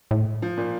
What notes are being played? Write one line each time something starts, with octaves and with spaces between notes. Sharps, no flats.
A2
F3
A#2